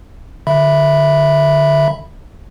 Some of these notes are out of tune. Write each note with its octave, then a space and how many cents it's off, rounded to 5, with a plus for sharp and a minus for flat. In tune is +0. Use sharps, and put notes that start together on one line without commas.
D3 +0 E5 +0 B5 +0